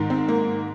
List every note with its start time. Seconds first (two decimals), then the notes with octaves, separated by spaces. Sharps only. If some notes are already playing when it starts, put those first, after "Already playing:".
Already playing: G#2 D#3
0.10 C4
0.29 A#3